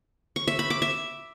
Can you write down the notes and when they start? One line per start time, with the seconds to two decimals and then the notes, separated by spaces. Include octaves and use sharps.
0.36 C#6
0.48 E5
0.59 B5
0.70 D6
0.82 E5